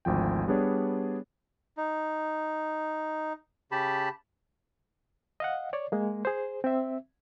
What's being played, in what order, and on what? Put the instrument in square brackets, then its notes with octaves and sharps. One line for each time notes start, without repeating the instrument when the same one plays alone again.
[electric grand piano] G#1 D2 F3 G5
G3 B3 D4 G#4 C#5 D5
[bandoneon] D#4
C#3 G4 A5 B5
[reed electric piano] D#5 F5 F#5
C#5 D5
G#3 A#3
G#4 C5
C4 E5